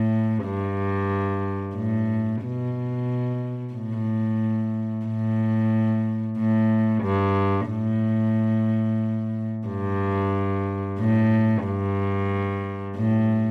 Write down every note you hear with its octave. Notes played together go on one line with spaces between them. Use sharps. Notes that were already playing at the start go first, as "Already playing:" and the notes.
Already playing: A2
G2
A2
B2
A2
A2
A2
G2
A2
G2
A2
G2
A2